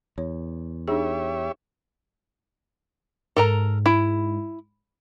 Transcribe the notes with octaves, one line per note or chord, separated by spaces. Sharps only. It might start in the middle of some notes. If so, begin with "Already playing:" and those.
E2 C#5
D4 D#4 G4 G#4 C#5 E5
G#2 A4 A#4 A#5
E4